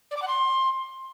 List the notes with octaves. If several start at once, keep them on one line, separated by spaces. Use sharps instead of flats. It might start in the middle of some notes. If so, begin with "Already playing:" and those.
D5
D6
F#5
C6